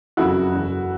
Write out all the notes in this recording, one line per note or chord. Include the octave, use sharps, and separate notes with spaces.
F#1 F2 C#3 F#3 E4 F#4
F#1 E2 C#3 F#3